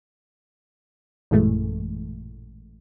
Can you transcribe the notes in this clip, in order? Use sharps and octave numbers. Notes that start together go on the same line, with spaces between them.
A1 F#2 A#2 E3 G#3 A3